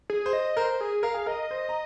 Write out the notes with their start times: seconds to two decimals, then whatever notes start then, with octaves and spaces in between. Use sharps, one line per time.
0.10 G#4
0.26 C5
0.33 D#5
0.57 A#4 C5
0.81 G#4
1.03 A#4 F5
1.14 G#4
1.26 A#4 D#5
1.51 C5
1.69 A#5